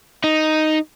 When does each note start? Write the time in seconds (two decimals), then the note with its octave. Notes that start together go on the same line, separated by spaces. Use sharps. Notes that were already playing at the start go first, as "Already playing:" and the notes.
0.24 D#4